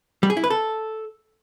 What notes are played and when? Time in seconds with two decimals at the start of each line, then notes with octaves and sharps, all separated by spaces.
0.23 G3
0.30 G#4
0.37 E4
0.44 B4
0.50 A4